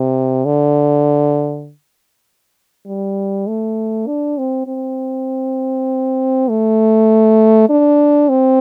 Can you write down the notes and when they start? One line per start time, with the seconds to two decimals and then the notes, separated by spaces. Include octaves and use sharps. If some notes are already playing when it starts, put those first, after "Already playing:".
Already playing: C3
0.45 D3
2.87 G3
3.47 A3
4.07 D4
4.38 C4
4.67 C4
6.49 A3
7.70 D4
8.29 C4